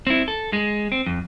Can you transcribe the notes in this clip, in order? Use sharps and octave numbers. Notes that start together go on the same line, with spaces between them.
C4 E4
A4
G#3
C4
F2